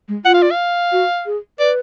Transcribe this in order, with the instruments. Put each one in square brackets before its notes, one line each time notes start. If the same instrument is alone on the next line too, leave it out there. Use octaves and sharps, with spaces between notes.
[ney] G#3
[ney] F4 [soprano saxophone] F#5
[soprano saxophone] F5
D5
F5
[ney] F#4
G#4
[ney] B4 [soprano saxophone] D5